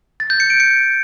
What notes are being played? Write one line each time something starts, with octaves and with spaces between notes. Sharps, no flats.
A6
G6
C#7
D7
C#7